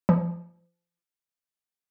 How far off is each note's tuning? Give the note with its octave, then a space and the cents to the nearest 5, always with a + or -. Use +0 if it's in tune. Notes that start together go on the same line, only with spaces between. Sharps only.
F3 -30